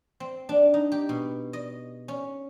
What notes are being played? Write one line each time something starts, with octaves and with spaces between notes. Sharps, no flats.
C4
D4
D#4
G4
B2
D#5
C#4